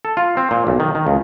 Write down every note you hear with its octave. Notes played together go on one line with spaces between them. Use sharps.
A4
F4
C4
A#2
B1
D#3
D#3
C#2